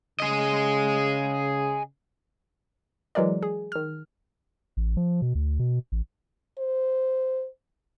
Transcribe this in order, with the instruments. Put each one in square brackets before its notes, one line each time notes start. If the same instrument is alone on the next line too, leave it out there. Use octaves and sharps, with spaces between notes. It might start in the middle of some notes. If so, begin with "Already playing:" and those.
[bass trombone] C#3 [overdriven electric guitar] G#4 D#5
[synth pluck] E3 F#3 G#3 A#4 D5
G#4
D#3 F6
[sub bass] A1
F3
B2
D2
B2
A1
[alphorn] C5